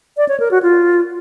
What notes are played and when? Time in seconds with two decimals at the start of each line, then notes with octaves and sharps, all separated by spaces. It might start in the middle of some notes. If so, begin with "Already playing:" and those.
0.17 D5
0.29 C#5
0.40 A#4
0.51 F#4
0.63 F4